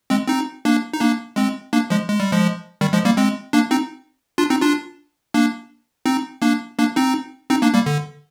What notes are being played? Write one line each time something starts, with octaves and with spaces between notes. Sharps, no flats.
G#3 C4
C4 D#4
A#3 D4
D#4
A#3 D4
G#3 C4
A#3 D4
F3 G#3
G#3
G3
F3 G#3
D#3 G3
F3 G#3
G3 A#3
G#3 C4
A#3 D4
C4 D#4
D4 F4
C4 D#4
D4 F4
A#3 D4
C4 D#4
A#3 D4
A#3 D4
C4 D#4
C4 D#4
A#3 D4
G3 A#3
D3